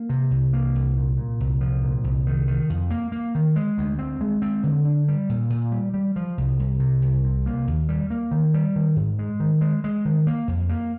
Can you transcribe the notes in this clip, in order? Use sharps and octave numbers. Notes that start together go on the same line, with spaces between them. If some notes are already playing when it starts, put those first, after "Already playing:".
Already playing: A#3
C3
C2
A#3
C2
A#2
A#2
C2
F3
A#2
C2
D#3
D#3
F2
A#3
A#3
D#3
G#3
D2
C4
G#3
C4
D3
D4
G3
A#2
A#2
G3
G3
F3
C2
C2
C3
C2
C3
A#3
D#2
G3
A#3
D#3
G3
D#3
G#2
G#3
D#3
G#3
G#3
D#3
A#3
F2
A#3